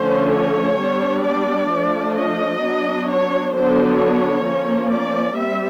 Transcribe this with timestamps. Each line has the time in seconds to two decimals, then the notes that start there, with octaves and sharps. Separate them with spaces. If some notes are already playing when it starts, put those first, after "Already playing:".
Already playing: D3 F3 A3 C#4 C5
0.35 C#5
0.81 G3 B3 D4
1.26 D5
1.72 F3 A3 D4
2.17 D#5
2.63 F#3 B3 D4
3.08 C#5
3.54 D3 F#3 B3 D4 C5
3.99 C#5
4.44 F3 A#3 C#4
4.90 D5
5.36 G3 C4 E5